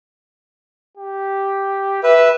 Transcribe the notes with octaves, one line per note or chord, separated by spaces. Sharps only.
G4
B4 E5